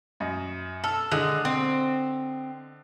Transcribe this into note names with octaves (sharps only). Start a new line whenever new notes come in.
F#2 D#5
A4 E6 F6
D3 G#3 D#5 F#6
C4